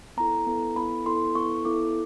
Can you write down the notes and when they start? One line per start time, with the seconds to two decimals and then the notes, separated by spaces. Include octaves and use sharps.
0.17 B3 E4 A4 A#5
0.47 B3 E4 A4
0.76 B3 E4 A4 B5
1.06 B3 E4 A4 C6
1.35 B3 E4 A4 C#6
1.65 B3 E4 A4 D6